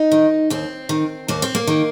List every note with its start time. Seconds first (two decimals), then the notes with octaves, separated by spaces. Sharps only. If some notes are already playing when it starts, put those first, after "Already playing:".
Already playing: D#4
0.12 D#3
0.50 D#2 C4
0.89 D#3
1.28 D#2 A#3
1.42 C4
1.55 A#3
1.67 D#3